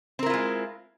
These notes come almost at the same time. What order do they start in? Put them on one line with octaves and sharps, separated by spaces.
C4 A#4 E4 F4 G#3